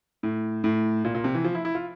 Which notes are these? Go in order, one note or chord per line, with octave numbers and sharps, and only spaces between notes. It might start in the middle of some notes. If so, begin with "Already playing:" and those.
A2
A2
A#2
A#2
C3
E3
F3
E4
E4
F4